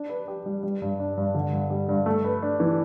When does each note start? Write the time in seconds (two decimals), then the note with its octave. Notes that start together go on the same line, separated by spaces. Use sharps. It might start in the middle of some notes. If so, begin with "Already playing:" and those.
Already playing: D4
0.09 B4
0.28 G4
0.46 G3
0.63 G3
0.82 G2
1.00 D4
1.17 G2
1.35 D3
1.53 G2
1.70 G3
1.89 G2
2.06 A3
2.24 B4
2.43 D4
2.60 E3